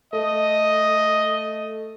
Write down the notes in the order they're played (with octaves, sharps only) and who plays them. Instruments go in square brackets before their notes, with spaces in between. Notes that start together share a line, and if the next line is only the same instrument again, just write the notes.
[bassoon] A3 [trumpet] D#5